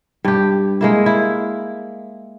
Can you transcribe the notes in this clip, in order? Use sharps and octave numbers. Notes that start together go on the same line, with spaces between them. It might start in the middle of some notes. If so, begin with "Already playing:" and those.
G2 G4
G#3 A#3 E4
E4